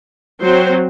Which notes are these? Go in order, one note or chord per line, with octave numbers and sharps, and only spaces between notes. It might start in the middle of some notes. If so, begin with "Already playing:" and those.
F#3 C4 C5